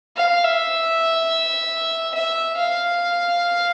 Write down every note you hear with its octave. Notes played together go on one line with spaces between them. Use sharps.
F5
E5
E5
F5